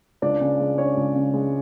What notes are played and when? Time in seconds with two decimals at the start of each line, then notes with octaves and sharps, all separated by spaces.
0.22 C#2 D4 D5
0.41 C#3
0.60 G#3
0.78 C#4 D4 C#5
0.97 C#2
1.16 C#3
1.34 G#3